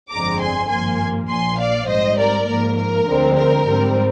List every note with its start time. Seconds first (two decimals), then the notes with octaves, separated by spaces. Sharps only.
0.11 G1 F2 D3 G#3 C4 A#5 D6
0.40 G#5 C6
0.70 G#1 G2 F3 A#3 G#5 C6
1.29 A#1 A#2 F3 G#5 C6
1.59 D5 F5
1.88 G#2 G3 C4 C5 D#5
2.18 A#4 D5
2.47 G#2 F3 A#3 A#4
2.77 A#4
3.07 D2 D3 F3 G#3 C4
3.36 A#4
3.66 G#2 G3 C4